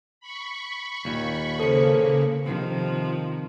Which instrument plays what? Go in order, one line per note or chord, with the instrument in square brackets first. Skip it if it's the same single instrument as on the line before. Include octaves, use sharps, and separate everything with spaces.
[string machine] B5 C#6
[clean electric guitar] D#2 A#2
[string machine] C#3 A#3 [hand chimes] A4 C5 C#7
[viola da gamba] C3 D#3 F3